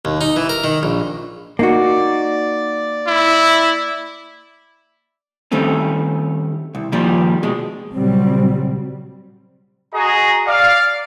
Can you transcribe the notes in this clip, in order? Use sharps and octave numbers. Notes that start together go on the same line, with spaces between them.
D#2
D#4
E3
A#4
D#3
A#1
A#3 D#4 F#4 D5
E4
D#3 G3 A3 C4 C#4
C2
A#2 D#3 F3 G3
B2 G#3
A#2 C#3 F#3 G3 C4
F#4 G#4 D#5 A#5
D5 F5